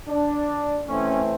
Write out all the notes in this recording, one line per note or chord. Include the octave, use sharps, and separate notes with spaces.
D4
E3 A3 C4 C#4